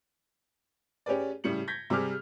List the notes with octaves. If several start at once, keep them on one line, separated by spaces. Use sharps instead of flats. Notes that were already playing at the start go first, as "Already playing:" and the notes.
C#4 G4 G#4 B4 D5
A2 C#3 G3 C#7 F#7
G6 G#6 A#6 B6
C3 G3 G#4 D6 F6